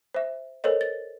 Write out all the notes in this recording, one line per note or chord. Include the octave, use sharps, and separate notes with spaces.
C5 E5
A4 A#4 C5 C#5 D#5
A6